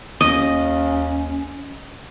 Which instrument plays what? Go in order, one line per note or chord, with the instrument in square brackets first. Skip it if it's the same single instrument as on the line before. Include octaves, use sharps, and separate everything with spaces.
[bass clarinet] D#2 [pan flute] C#4 [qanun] D#5